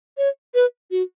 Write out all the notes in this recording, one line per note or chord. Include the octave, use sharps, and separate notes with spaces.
C#5
B4
F#4